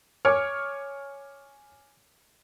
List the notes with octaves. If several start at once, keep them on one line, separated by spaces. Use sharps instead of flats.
C#5 G#5 D6 F6